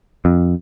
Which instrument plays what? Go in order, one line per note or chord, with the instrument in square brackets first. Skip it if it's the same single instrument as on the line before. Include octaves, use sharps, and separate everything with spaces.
[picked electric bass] F2